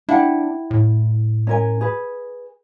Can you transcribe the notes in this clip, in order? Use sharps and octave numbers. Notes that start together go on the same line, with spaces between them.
D4 E4 F#5 G5
A2
C#4 A#4 G#5
G#4 B4